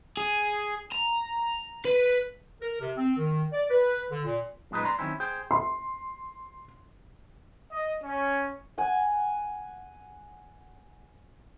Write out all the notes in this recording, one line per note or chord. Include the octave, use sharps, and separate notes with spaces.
G#4
A#5
B4
A#4
C3
C4
D#3
D5
B4
D3
A#2
F#2 A#2 G#3 D#4 B4
D5 A#5 C6
D#3 F#3 C4 C#4 E4
G#4 C5 G5
C6
D#5
C#4
F#5 G#5